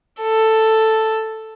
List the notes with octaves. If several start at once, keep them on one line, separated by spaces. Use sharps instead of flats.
A4